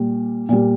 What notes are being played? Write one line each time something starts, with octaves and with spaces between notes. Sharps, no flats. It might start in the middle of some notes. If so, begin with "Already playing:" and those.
Already playing: A#2 G3
A#2 G3